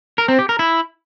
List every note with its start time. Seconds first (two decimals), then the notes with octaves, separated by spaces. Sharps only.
0.18 A#4
0.28 C4
0.39 G4
0.49 A#4
0.59 E4